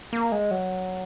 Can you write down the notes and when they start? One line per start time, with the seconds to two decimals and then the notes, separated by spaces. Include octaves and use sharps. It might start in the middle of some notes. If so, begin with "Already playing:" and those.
0.13 A#3
0.32 G#3
0.51 F#3